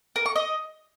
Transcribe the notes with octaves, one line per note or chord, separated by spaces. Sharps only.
A#4
C#6
D#5